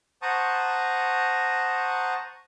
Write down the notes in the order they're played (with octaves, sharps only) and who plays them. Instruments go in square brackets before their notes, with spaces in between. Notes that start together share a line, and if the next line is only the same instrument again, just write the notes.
[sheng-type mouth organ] C5 F#5 A5 A#5 C#6 D#6